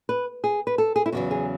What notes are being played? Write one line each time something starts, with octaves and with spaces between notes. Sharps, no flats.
B4
G#4
B4
A4
G#4
E4
E2 C#3 F#3 F#4
G#4